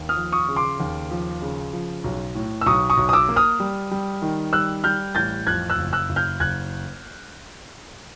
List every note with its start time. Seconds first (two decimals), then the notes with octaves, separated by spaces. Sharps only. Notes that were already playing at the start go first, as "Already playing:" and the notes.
Already playing: D#2
0.09 D#6 F6
0.17 F3
0.32 C#6 D#6
0.48 C#3
0.56 C6 D6
0.80 D#2
1.11 F3
1.42 C#3
1.73 F3
2.04 B1
2.35 A2
2.61 E6
2.66 B1 C#6 D#6
2.90 C#6 D#6
2.97 B1
3.09 D#6
3.13 D6 E6
3.29 A#3
3.36 D#6 F6
3.60 G3
3.91 G3
4.22 D#3
4.53 G3 E6 F#6
4.84 G3 F6 G6
5.15 A1 G6 A6
5.47 F2 F#6 G#6
5.70 E6 F#6
5.77 F#1
5.93 E6 F#6
6.09 F#1
6.16 F6 G6
6.40 F#1 F#6 G#6